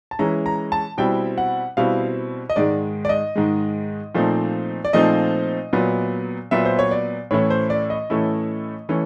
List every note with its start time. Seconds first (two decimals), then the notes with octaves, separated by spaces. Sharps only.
0.11 A5
0.19 E3 G#3 C#4 E4 A#5
0.46 A#5
0.72 A5
0.98 B2 G3 C4 E4 G5
1.38 F#5
1.77 B2 G3 C4 E4 F5
2.50 D#5
2.56 G#2 D#3 G#3 D5
3.05 D5
3.09 D#5
3.36 G#2 D#3 G#3
4.15 A#2 F3 A3 C4 D#4
4.85 D5
4.93 A#2 F3 A3 C4 D#4 D#5
5.73 A#2 F#3 B3
6.51 A#2 F#3 B3 E5
6.65 C5
6.79 C#5
6.91 D5
7.31 A2 E3 A3 C#4 E4 C#5
7.50 C5
7.70 D5
7.90 D#5
8.10 A2 E3 A3 C#4 E4
8.89 E3 A3 C#4